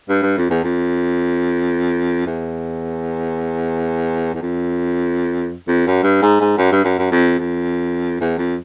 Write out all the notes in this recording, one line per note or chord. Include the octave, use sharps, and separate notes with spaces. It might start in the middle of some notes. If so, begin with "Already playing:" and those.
G2
G2
F2
E2
F2
E2
E2
F2
F2
F#2
G2
G#2
G#2
F#2
G2
F#2
F#2
F2
F2
E2
F2